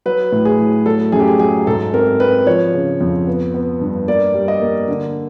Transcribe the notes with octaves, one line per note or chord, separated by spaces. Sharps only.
F#3 B4
A2
G#4
A2
F#3 A4
F#2 G#4
G4
G#4
F#3 G#4
G#2 A4
C4 A#4
C4 B4
F3 C#5
C#3
F2
B3
B3
G2
A#3 D5
G3
D#5
A#3
D3